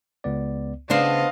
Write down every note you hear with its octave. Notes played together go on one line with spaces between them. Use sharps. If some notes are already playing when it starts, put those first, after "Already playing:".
C#2 B3 D5
C#3 B3 D4 C5 D#5 F5